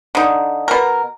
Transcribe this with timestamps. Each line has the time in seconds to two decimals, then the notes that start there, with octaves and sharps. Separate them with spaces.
0.15 D3 D#4
0.68 B2 A#4